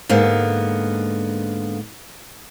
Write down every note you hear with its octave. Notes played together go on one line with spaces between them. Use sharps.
G#2 D3 A#3 B3